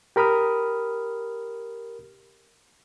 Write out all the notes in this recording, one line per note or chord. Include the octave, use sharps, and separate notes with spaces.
G4 A#4 B5 D#6 F6